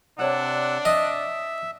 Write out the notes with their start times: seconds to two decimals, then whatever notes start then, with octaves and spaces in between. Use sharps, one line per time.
0.19 C3 D4 C#5 D5 F#5 E6
0.85 D#5 E5